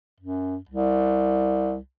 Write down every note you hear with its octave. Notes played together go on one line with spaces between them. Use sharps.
F#2
C2